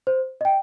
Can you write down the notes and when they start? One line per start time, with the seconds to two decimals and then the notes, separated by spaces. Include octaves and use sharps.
0.07 C5
0.41 D#5 G5